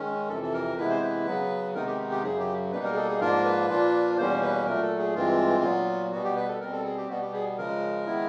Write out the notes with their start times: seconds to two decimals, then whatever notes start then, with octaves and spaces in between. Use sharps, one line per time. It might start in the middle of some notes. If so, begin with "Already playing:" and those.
Already playing: D#3 G#3 C#4
0.29 F2 C3 E3 A4
0.43 A4
0.53 A#4
0.78 C3 E3 G#3 B3 E4 B4
0.90 C5
1.02 B4
1.26 C#3 F#3 B3
1.75 C3 D#3 G#3 B3 D#4 A#4
1.87 G4
2.11 G4
2.23 F#2 C#3 F#3 G#4
2.40 G4
2.72 B2 G3 A#3 D#4 B4
2.84 A#4
2.92 G#4
2.96 A4
3.09 G#4
3.20 G#2 F3 A#3 D4 F4 A#4
3.45 B4
3.69 A#2 F3 A#3 D4 F4
4.18 E2 B2 G3 A#3 C#4 C5
4.42 B4
4.66 A#2 F#3 A3 A#4
4.82 A4
4.99 G#4
5.15 G2 E3 G#3 C4 F4
5.63 A#2 F#3 B3
6.12 B2 G3 B3 F#4
6.24 G4
6.36 B4
6.48 A4
6.60 B2 G3 C4 A#4
6.73 A4
6.85 G#4
6.97 G4
7.09 B2 G3 B3 F#4
7.21 G4
7.33 G#4
7.57 C#3 F3 G#3 A#4
8.06 D#3 G#3 B3 E4